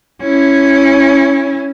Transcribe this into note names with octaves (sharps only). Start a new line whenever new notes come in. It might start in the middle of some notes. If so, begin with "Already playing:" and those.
C#4 E4